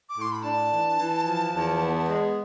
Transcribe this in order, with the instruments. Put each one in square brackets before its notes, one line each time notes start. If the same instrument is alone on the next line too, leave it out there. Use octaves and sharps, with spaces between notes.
[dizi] D6
[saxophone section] A2
[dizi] C6
B5
[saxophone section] D4 [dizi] A5
[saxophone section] E3
E3
F3
E2
B3
G#3